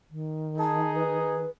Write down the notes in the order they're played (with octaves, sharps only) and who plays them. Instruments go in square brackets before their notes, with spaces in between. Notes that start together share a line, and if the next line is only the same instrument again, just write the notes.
[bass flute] D#3
[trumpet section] D#4 G#4 [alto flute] A5
[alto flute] B4